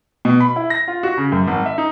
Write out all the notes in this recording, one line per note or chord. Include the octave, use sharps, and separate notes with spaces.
B2
B5
E4
A#6
F4
F#4
C#3
F#2
G#1
E5
D#4